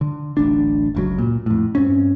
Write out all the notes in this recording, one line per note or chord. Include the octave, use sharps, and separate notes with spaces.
D3
D1 A1 D4
F#1 C#2 F#3
A#2
F2 A2
G2 C4 C#4